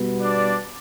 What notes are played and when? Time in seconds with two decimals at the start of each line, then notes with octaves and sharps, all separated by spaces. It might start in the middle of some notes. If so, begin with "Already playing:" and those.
Already playing: B2 G3 B3
0.20 D4 D5